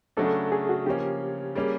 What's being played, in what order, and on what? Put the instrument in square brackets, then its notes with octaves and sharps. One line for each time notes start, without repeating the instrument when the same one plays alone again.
[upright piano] C#3 F#3 A3 D4 [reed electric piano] A4
[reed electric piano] G#4
F#4
[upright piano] C#3 F3 A#3 C#4 [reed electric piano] G4
[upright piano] G3 A#3 C#4 [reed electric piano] G#4